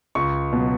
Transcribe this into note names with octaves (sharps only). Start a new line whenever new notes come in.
C#2 C#6
B2 F#3